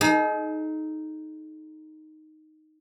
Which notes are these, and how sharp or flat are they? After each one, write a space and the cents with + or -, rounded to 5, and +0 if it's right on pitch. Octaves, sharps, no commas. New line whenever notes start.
D#4 +0 G#4 +45